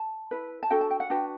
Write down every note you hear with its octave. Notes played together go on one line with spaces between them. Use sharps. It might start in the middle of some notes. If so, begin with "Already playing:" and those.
Already playing: A5
E4 B4
A5
D4 F#4 A4 G5
A5
G5
F#5
D4 F#4 B4 G5